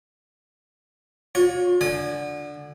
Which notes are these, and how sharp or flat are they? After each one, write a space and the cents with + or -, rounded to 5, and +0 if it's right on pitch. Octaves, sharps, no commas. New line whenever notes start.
F4 +40 C#5 +0
D3 +0 G#5 +0 D#6 -40